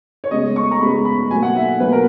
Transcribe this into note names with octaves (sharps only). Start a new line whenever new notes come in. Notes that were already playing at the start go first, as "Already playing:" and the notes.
C#5
C#3 G#3 B3 D#5
C#6
A#5
C#3 G#3 B3 B5
B5
B2 F#3 A#3 G#5
F#5
E5
B2 F#3 A#3 B4
A#4